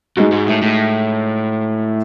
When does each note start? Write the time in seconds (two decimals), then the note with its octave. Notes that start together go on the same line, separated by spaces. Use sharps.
0.17 G#2 G#3 D#4 F#4
0.32 G#2
0.47 A2
0.62 A2